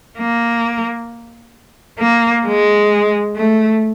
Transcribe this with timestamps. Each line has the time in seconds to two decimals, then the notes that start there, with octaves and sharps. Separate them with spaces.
0.18 A#3
1.99 A#3
2.46 G#3
3.36 A3